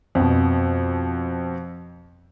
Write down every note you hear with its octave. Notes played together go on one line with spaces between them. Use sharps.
F2 B2